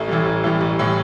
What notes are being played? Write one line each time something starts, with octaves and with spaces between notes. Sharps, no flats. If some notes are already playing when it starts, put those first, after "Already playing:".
Already playing: A1 A3
A2 E3 G3
A1
A2 E3 G3
A1
A2 E3 G3